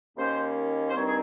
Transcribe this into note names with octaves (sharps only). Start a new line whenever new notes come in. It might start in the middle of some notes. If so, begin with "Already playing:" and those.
D#2 D#3 A#3 C#4 C5
C5
G2 D#3 G3 C4 D#4 C#5
G#4